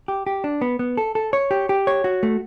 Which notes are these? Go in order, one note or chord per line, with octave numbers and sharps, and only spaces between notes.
G4
G4
D4
B3
B3
A4
A4
C#5
G4
G4
C#5
F#4
A3